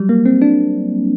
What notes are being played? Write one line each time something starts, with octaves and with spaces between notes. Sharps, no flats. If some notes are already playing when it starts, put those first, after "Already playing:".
Already playing: F#3 G3
A#3
C4
D4